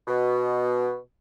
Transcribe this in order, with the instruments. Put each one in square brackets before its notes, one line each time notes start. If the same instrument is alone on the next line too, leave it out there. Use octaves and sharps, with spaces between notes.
[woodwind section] B2